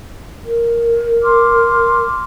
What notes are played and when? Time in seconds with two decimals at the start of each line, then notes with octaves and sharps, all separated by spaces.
0.45 A#4
1.22 C6 D6 F6